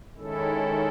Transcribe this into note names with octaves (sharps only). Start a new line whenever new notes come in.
D#3 G#3 C#4 E4 A4